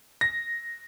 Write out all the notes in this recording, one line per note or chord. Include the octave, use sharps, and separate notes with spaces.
A#6